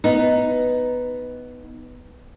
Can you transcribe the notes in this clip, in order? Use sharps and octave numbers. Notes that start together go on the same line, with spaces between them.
B3 D#4